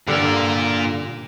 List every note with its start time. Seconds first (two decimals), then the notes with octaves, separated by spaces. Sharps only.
0.08 G2 A#2 D3 A#4